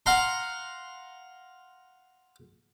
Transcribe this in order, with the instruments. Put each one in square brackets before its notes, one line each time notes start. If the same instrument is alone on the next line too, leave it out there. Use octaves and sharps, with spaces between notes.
[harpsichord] F5 F#5 A#5 C6